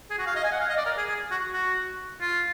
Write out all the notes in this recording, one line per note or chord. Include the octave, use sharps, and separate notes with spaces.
G#4
F#4
F5
D#5
G#5
F#5
F5
D#5
D5
A#4
G#4
G#4
F#4
F#4
F4